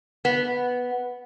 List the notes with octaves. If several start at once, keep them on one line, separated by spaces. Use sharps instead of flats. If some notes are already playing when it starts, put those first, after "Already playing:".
B3